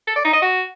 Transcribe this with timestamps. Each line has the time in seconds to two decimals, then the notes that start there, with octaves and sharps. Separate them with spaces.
0.07 A4
0.16 D5
0.25 D#4
0.33 D#5
0.42 F#4